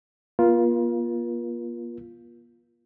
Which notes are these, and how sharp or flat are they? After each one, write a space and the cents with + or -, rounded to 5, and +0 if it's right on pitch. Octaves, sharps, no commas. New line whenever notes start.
A#3 +45 F4 +0 A#4 +40